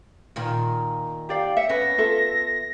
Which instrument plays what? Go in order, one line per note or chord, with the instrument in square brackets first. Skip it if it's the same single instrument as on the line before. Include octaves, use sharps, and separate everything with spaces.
[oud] A#2 D#3 F4
[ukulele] G4 D5 F5 [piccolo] G5
[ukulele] E5 [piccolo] C#7
[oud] B3 [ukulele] C#4 B4 [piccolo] A#6
[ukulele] F4 A4 E5